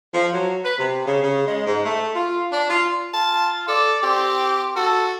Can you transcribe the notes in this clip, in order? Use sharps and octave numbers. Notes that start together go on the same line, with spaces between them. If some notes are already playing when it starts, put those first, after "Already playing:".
F3
F#3
B4
C3
C#3
C#3
G#3
G#2
A3
F4
D4
F4
F4 A5
A4 D5
C4 G4
F#4 A4